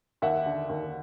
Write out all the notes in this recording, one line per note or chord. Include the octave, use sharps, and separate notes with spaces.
D#2 E5 F#5
D3
D#2